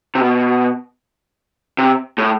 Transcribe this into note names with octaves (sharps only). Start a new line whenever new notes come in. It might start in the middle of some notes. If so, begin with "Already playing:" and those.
C3
B2
C3
A2